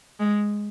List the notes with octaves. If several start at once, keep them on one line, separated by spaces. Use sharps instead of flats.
G#3